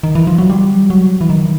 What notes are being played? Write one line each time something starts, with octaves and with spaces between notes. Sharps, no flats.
D#3
E3
F3
F#3
G3
F#3
E3
D#3